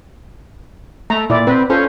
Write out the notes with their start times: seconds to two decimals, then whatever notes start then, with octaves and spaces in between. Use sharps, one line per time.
1.10 A3 A#5
1.30 A#2 E4 D5
1.47 C4 B4
1.70 C#4 F4 A4 C5